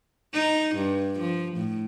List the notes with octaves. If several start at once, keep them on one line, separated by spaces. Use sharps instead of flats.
D#4
G2
F3
A2